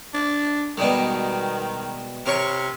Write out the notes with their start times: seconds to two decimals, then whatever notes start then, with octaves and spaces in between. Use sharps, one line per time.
0.14 D4
0.78 B2 D#3 G3 G#3
2.26 C3 A#4 C#5 C#6